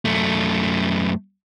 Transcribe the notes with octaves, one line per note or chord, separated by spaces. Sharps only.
F#2 A3